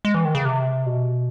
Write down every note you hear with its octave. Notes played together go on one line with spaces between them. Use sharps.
G#3
E3
D#3
C#3
C3
B2